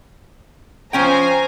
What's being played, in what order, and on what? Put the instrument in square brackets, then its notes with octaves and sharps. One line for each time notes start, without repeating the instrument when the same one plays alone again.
[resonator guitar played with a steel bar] F3 C#4 G5 [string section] C5 G#5 A#5